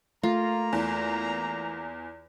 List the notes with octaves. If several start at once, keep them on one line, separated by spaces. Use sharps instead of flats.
A3 A#3 F4 A#5
E2